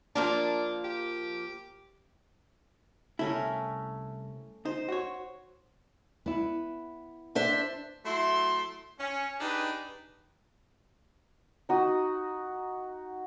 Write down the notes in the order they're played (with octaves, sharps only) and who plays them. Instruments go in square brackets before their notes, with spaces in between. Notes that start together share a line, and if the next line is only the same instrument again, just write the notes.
[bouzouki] F3 A#3 A#4 [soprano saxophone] D4
[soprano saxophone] G4
[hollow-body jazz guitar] C2 E4 [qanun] A3 C#4 A#4
[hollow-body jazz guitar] D#4 [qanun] C5
[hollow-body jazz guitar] F#4 C#5
[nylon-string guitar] B3 E4
[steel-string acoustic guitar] D4 C5 E5
[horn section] F#3 A3 E4 C6
C#4
D4 D#4 G4 G#4 B4
[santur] D#4 F#4 D#6